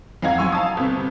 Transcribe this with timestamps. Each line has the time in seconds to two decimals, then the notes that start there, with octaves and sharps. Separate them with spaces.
0.22 F2 D#4 F5 F#5 A#5 G#6
0.38 F#2 G#5 C#6 E6
0.52 F5 A5 D#6
0.77 G1 C3